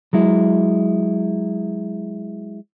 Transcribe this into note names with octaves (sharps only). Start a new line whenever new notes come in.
F#3 G#3 E4